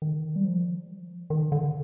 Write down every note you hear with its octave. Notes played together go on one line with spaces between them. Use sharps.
D#3
G3
F3
D#3
D3